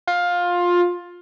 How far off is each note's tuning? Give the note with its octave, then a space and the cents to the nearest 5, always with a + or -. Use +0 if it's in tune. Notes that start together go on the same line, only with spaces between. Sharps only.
F4 +15